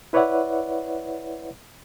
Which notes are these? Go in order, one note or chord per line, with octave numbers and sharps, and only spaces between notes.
E4 B4 C#5 D5 E5 F#5